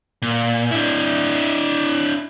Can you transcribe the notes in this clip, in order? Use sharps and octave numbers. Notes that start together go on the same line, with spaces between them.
A#2
D4 E4